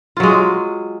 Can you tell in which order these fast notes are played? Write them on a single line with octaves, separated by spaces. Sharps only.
F4 F#3 G#3